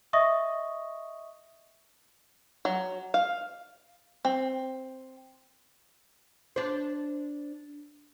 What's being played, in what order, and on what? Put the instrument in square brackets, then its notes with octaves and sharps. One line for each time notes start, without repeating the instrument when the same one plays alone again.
[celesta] D#5 E5 C#6 D#6 A#6
[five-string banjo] F#3
F5
C4
[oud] D4 C5